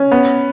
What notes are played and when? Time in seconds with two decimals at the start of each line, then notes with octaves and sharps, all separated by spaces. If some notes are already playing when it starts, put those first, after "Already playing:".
Already playing: C#4
0.12 B3